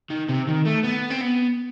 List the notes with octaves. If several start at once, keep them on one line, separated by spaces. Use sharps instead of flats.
D#3
C3
D#3
A3
B3
C4
B3